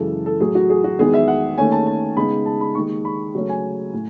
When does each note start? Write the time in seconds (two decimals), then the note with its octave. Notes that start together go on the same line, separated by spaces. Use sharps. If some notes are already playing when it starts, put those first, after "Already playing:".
Already playing: F#2 C#3 E3 G#3 A4
0.26 A4
0.40 A2 F#3 A3 G#4
0.55 F#4
0.70 G#4
0.84 F#4
0.99 E2 D#3 G#3 B3 G#4
1.14 E5
1.28 F#5
1.58 D#2 D#3 A3 C#4 G#5
1.72 A5
1.87 A5
2.17 C#3 G#3 B3 D#4 B5
2.46 A5
2.61 B5
2.75 D#2 D#3 G#3 C#6
3.05 B5
3.35 C#3 F#3 A3 C#4
3.49 G#5
3.93 A2